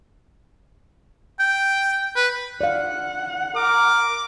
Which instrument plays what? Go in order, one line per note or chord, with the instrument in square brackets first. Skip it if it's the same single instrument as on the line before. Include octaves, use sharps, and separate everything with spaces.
[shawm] G5
B4
[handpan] D5 F5 [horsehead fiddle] F#5
[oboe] A#4 [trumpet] D6